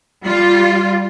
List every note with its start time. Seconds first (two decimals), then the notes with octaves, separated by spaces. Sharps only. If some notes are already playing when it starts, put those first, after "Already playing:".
0.25 G3 F4